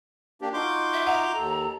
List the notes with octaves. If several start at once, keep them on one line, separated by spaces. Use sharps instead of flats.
A#3 D4 G4
D#4 F4 F#4 C6 D6 G6
E5
E5 F#5 A#5
D#2 A4